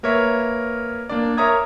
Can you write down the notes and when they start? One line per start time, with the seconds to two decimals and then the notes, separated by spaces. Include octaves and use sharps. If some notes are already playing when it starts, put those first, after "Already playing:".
0.03 A#3 A#4 B4 C#5 E5
1.09 A#3 D4 D5
1.37 A#4 C#5 E5 A#5 D#6 G#6